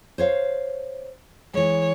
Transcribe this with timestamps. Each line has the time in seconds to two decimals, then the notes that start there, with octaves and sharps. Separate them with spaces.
0.18 C5 C#5 F5
1.54 E3 G#3 C#5